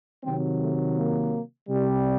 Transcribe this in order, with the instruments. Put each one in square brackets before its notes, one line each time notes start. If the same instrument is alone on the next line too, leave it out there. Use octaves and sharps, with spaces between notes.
[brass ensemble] C3 D#3 F#3 C4
A3
A#3
C3 G3